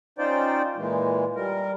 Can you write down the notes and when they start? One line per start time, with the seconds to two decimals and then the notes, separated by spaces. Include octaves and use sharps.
0.18 C#4 D#4 F4 C5 D5 G5
0.76 A#2 E3 G#3
1.36 G3 A#4